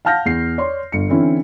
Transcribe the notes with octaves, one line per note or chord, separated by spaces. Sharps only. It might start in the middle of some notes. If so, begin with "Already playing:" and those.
F5 F#5 A5 F6 G6 A#6
E2 C7
C#5 D5 C6
G1 C#7
D3 E3 C4 C#4 E4